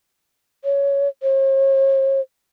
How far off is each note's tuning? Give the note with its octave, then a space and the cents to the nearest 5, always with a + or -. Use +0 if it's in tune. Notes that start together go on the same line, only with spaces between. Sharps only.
C#5 +10
C#5 -45